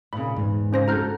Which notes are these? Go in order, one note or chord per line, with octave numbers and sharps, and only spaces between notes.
A#2 C#3 B5
E2 G#2
C#3 C#4 C5 A#6
F#4 A4 A#5 F6 G6